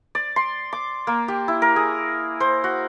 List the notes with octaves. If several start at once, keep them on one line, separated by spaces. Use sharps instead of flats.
D5
C6
D6
A#3
G4
E4
A#4
G#4
C5
F#4